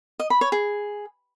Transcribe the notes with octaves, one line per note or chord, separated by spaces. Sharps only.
D#5
B5
C#5
G#4